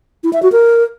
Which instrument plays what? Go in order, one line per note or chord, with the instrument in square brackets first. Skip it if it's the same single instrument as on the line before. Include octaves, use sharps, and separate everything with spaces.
[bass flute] E4
E5
F#4
A#4